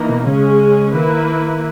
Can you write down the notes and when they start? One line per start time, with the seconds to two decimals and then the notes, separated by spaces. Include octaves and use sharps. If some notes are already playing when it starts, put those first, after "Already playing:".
Already playing: E3 A#3 D#4
0.09 B2
0.26 C#3 G#3 C#4 G#4
0.94 D#3 A#3 E4 B4